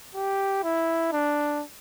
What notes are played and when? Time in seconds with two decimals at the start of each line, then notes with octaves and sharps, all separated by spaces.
0.15 G4
0.63 E4
1.12 D4